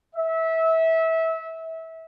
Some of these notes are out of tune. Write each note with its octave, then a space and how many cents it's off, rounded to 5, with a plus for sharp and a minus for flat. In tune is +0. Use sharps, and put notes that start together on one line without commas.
E5 -25